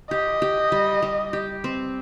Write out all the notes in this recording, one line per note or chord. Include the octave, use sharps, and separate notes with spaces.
G4 D#5
G4
G3
G3
G4
C4